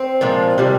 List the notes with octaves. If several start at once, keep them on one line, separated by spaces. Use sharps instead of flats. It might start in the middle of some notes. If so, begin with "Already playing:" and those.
Already playing: C4
A#2 F3 G#3
C3 D#3 G3